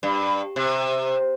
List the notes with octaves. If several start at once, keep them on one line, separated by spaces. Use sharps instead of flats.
G2
C3